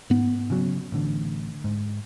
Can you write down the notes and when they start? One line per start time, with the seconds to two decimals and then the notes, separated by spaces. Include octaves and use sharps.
0.10 G#2 B3
0.50 C#3 F#3
0.92 A1 D3
1.64 G#2